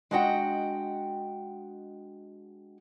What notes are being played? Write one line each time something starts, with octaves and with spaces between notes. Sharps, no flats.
G#3 D4 F#4 D#5 F#5 G5